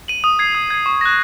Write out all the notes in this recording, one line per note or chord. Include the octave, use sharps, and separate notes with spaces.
D#7 F#7
D#6
G#6 C7
D#6
G#6 C7
C#6
F#6 A#6